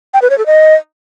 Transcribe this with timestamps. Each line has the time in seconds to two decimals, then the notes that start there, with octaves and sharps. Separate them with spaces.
0.14 G5
0.22 B4
0.30 C#5
0.38 A4
0.46 D#5